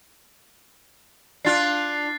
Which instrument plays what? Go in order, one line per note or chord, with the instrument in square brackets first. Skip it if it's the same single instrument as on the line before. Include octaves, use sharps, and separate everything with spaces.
[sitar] D4 F4 [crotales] F#6 A6 C7